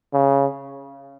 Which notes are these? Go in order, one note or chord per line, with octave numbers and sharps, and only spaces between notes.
C#3